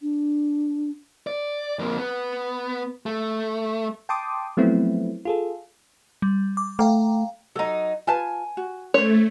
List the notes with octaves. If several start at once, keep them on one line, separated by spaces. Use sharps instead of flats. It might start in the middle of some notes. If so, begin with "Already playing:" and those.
D4
D5
F2 A#3
B3
A3
G5 A5 C6 D6 D#6
F3 F#3 A3 B3 C4 E4
F4 G#4 A4
G3
D6
A3 F5 G5 A#5
F#3 D#4 A4 A#5
F4 B4 G#5 A5
F#4
A3 C#4 C5 C#5